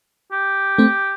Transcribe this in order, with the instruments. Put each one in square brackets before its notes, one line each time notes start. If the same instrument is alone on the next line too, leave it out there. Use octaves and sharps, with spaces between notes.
[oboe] G4
[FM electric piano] A3 C4